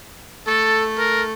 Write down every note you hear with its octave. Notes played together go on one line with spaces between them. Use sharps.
A3 A4
A#4